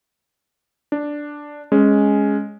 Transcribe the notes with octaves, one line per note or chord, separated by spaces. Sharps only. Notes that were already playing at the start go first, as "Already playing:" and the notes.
D4
G#3 C#4